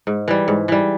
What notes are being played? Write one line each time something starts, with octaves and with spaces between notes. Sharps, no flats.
G#2
E3 G3
G#2
E3 G3